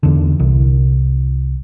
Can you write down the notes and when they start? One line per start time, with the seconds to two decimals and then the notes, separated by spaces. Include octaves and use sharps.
0.03 E2 D3
0.40 C2